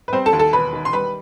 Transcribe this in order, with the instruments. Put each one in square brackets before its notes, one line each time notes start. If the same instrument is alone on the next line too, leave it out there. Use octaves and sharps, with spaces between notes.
[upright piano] B4
G3 C4 C5
A4 A5
D#2
A4 A5
E1 B4 B5
D#3
C6
G3 B4 B5